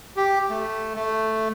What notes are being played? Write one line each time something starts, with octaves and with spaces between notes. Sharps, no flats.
G4
A3
A3